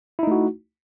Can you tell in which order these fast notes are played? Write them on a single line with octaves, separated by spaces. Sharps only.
E4 D#4 A3 F#4